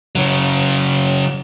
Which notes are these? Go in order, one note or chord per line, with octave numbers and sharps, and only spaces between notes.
C#3 F#3